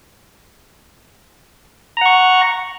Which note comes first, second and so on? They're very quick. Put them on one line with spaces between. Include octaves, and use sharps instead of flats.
A#5 F#5 C#6